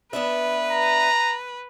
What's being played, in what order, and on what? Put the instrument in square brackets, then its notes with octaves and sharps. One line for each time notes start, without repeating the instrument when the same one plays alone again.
[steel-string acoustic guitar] B3 D4 E5 [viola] B4
[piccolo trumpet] A#5